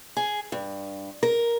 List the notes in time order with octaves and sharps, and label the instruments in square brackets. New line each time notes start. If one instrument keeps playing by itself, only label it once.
[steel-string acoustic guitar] G#4
G2
A#4